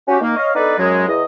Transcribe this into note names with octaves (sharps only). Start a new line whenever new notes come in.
C#4 F#4 G4
D#3 A#3
C#5 D#5 F5
B3 D4 D#4 A4 B4 D5
F#2 F#3 G#3
E2 D#5